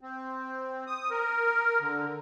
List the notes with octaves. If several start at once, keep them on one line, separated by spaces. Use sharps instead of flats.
C4
D#6
A#4
D3